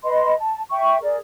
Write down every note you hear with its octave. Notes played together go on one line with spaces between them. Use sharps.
B4 D#5 B5 C6
A5
E5 G5 C#6
G#4 A#4 D5